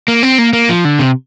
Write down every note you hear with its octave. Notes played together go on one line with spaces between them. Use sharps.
A#3
C4
A#3
A#3
F3
D3
C3